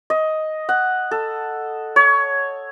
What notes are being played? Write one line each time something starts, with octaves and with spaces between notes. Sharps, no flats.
D#5
F#5
A4
C#5